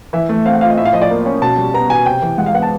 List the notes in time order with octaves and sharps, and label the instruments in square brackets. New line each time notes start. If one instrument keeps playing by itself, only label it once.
[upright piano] E3 [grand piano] E5
[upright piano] A3
[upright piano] C4 [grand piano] F5
[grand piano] F#5
[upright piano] F4 [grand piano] F5
[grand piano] D#5
[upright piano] A2 [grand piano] E5
[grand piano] F5
[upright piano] F3 [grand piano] D#5
[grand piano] D5
[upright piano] A#3
C#4
[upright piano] B2 [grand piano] A5
[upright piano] G3
[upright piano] B3 [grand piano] A#5
[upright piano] B2 [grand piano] G#5
[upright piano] C3 [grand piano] G5
[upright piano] E3
[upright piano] G#3 [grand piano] F#5
[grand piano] F5
[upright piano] B3 [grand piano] F#5
[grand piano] A5